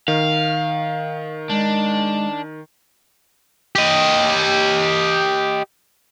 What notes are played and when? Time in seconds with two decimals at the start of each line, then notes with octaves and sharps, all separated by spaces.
0.08 D#3 F5
1.50 G#3 D4
3.76 G4 D#5